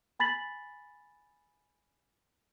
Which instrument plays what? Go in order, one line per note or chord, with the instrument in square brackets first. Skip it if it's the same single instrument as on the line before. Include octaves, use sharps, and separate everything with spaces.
[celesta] G#5 B5 A6 B6 F#7